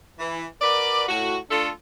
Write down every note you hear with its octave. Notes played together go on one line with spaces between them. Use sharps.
E3
F#4 A#4 B4 D5
A2 F#4
A3 D4 F4 A4